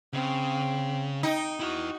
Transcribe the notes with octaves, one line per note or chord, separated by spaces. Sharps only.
C#3 C4
D#4 G5
E4 F#4 F#5